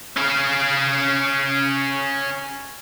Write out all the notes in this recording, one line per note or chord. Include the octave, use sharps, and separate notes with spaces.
C#4 F5